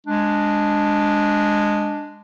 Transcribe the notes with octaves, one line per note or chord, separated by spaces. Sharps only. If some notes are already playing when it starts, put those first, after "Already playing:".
G#3 D4